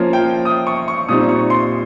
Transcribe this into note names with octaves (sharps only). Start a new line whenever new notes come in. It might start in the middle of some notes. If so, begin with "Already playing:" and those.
Already playing: F3 A#3 C#4 F4
G5
D#6
C#6
C#6
A#2 G3 C4 D#4 D#6
C#6
C6